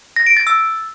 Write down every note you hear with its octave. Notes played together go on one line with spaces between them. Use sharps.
A#6
D7
A6
E6